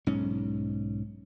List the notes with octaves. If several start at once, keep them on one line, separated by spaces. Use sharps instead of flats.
B1 G#2 C#4